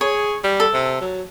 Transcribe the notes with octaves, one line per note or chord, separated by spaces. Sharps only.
G#4 C#5
G3
A4
C3
F#3